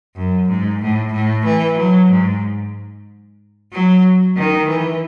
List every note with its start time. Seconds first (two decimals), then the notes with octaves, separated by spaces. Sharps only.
0.16 F#2
0.49 G#2
0.82 A2
1.13 A2
1.46 E3
1.77 F#3
2.10 G#2
3.72 F#3
4.37 D#3
4.69 E3